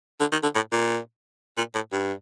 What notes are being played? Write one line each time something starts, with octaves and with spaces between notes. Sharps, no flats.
D3
D#3
D3
A2
A#2
A#2
A2
G2